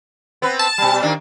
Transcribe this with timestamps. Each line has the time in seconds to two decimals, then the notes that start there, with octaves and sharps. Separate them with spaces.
0.42 B3 C4 B4
0.59 A5
0.78 B2 G3
1.02 D#3 A#3 D4